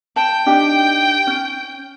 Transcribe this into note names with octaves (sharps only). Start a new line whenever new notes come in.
G5 A5
D4 D#4 G4
C#4